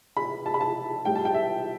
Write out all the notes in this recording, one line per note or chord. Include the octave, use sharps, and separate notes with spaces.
B5
A5
B5
A5
A2 G3 G5
A5
G5
E5